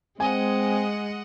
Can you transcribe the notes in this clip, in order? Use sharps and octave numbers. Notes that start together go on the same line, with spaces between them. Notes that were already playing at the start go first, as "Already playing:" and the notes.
G#3 C4 D#5 F#5 G#5